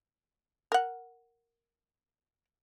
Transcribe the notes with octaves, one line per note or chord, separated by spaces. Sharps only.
A#4 F#5